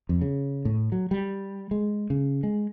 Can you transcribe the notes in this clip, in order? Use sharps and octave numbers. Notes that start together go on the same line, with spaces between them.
F2
C#3
A2
F#3
G3
G#3
C#3
G#3